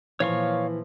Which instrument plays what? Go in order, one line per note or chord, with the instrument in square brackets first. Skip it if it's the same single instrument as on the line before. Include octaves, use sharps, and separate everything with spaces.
[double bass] A#2 F3 [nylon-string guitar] E3 [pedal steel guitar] C#5 F5 C#6